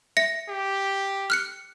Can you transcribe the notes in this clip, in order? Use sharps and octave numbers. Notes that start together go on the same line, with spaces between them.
E5 A#6 C#7
G4
F6 F#6 C#7